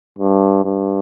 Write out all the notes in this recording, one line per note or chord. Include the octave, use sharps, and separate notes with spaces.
G2
G2